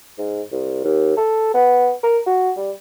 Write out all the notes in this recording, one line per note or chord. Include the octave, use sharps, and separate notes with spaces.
G#2
C2
D#2
A4
B3
A#4
F#4
G3